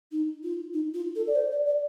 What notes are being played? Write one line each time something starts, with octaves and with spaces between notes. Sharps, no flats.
D#4
F4
D#4
F4
A4
D5
C5
D5
D5